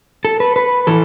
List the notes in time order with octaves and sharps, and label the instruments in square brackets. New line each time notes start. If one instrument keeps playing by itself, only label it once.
[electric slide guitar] A4
B4
B4
E3 A4